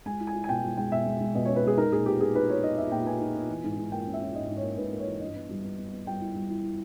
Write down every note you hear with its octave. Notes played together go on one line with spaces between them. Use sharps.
G#3 G#5
E4
G#5
E4
G#5
B2 G5
G#3
G#3 G5
B2 E5
G#3
G#3
B2 D#5
C#4 C#5
B4
G#3 G#4
D#4 A#4
A#2 G#4
B3 G4
B3 G#4
D#4 B4
D#4 C#5
D#4 D#5
B3 E5
A#2 G5
B3 G#5
D#4
B3
E3
G#2
G#2
A#3 G5
C#4
E5
C#4
G#2 D#5
G#2
C#5
A#3
G#2 B4
A#3
C#5
E3
G2 D#5
B3
G3
B3
B3
B3
G3 G5
E4
G3
E4
E4